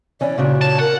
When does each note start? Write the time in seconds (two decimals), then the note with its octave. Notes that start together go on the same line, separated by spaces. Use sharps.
0.21 E3 C#4 D5
0.38 A#2 C#3 D4 F#4
0.61 C#5 A5
0.80 A#4 F#5